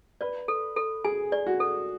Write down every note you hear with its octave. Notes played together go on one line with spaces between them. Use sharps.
B4 D5
A4
A4
G#4 G#5
D5
F#4
A4